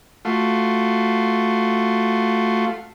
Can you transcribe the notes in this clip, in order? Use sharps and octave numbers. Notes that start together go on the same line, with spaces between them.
A3 F4 F#4